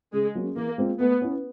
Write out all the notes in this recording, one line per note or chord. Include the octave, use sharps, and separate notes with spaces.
C#3 G#3
F#3 A#3 C#4
E3 A#3
G#3 C4 F4
A3 B3
C#4 E4